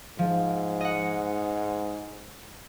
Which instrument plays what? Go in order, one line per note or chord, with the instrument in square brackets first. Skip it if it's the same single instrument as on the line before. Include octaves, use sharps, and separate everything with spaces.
[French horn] G#2 [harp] F3
[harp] D#5 F#5